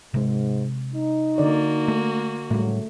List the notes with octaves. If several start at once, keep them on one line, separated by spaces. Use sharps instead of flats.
G#2 C3 G#3
D#4
D3 A#3 F#4 D5
A3
D2 A2 C#3 F#3 G3 A3